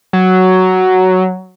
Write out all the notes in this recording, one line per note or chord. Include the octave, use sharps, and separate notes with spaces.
F#3